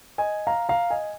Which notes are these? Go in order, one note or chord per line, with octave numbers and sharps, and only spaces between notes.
D#5 G#5
F5 A#5
F5 A#5
D#5 G#5